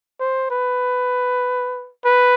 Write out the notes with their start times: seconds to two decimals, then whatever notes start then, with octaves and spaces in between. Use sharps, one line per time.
0.20 C5
0.51 B4
2.05 B4